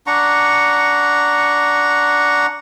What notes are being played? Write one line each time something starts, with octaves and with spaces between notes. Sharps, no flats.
D4 F#5 A#5 C#6